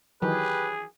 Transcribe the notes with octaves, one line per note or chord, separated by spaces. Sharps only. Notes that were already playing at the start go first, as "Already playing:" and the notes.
D#3 E3 F#3 G4 G#4 B4